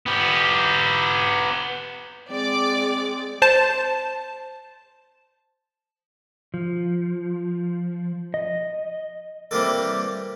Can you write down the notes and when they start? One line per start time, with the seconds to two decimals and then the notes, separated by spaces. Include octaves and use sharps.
0.06 B3 G4
2.30 G#3 C4 D5 D6
3.42 C5 A5
6.54 F3
8.34 D#5
9.51 C3 E3 G3 A#3 G4 A4